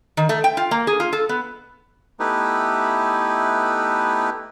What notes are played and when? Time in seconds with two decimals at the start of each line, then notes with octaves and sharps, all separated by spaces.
0.17 D#3
0.29 A3
0.44 G5
0.57 F4
0.71 A#3
0.87 G#4
1.00 F4
1.13 A4
1.29 B3
2.20 A3 B3 D#4 E4 G4 B4